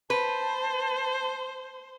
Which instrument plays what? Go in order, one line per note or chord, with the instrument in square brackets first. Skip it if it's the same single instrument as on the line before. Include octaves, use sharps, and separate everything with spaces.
[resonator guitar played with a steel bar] B4 [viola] C5 [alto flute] A5